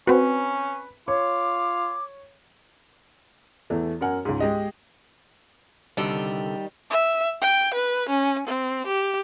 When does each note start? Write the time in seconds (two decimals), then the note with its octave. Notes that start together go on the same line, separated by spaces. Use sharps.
0.07 C4 C#4 F#4 B4
1.08 F4 C#5 D6
3.70 E2 E3 A3
4.01 F#2 A#4 F#5 G#5
4.25 C#2 G#2
4.40 G#3 G4 D#5
5.97 C2 D3 D#3 G3 A4 G5
6.91 E5
7.42 G5
7.74 B4
8.09 C#4
8.48 C4
8.87 G4